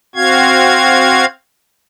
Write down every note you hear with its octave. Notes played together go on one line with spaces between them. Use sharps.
C4 F#4 F5 G#6